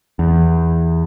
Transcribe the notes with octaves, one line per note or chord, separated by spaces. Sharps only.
E2